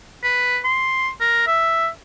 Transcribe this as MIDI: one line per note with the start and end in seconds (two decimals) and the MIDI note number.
0.24 0.59 71
0.65 1.10 84
1.21 1.43 70
1.47 1.88 76